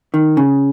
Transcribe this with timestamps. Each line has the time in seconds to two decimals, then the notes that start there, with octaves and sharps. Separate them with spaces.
0.14 D#3
0.37 C#3